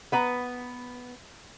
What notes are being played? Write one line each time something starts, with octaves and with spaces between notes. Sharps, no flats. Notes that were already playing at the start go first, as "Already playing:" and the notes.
B3 B4 A#5